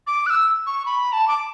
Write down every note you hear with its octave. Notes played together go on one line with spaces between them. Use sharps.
D6
F#6
E6
C#6
B5
A5
D6